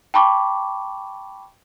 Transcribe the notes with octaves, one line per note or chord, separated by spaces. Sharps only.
G5 A5 B5 C#6 D6